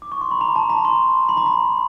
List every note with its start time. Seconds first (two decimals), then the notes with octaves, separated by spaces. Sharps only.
0.02 D6
0.12 C#6
0.21 C6
0.31 B5
0.41 A#5
0.56 A5
0.70 A#5
0.85 C6
1.29 B5
1.37 A#5
1.46 B5